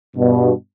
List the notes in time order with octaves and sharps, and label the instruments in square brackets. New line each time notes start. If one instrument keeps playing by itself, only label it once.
[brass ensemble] G2 B2